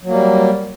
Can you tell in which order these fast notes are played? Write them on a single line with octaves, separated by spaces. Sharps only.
F#3 A#3 G3